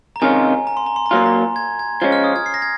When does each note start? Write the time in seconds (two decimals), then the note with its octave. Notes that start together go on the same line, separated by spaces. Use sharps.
0.16 A#5
0.22 C3 D#3 G#3 C#4 F4 G#5
0.67 A#5
0.77 C6
0.86 A#5
0.96 C6
1.06 A#5
1.11 A#2 F#3 A#3 F4 C6
1.26 A#5
1.56 G#6
1.79 G#6
2.01 F3 G#3 C#4 G#6
2.12 F6
2.24 D#6
2.36 G#6
2.46 C7
2.54 A#6
2.62 G#6